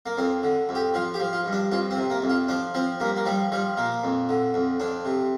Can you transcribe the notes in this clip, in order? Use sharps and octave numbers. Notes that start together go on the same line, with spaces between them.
A#3
F2 C4
D3
F2
G4
F3 F4
G4
F3
F4
G2
D4
F2 F4
C4
C3
A#3
F2
F4
F3 D4
F3 C4
G2 A#3
A#3
F3 G3
F3 G3
A#2 A#3
F2
D3
F2
F2 D4
C3